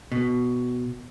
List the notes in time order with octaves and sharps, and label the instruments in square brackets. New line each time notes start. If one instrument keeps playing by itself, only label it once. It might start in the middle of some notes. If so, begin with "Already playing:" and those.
[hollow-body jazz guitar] B2